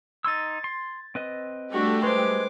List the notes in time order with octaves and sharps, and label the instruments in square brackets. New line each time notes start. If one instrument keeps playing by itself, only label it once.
[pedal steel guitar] D#4 C6 E6 [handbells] G#6 A6
[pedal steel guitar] C6
C4 B4 D#5
[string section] G3 A3 G4 [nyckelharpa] D4 F#4
[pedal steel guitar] G#3 [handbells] B4 C5 [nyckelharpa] C6 D6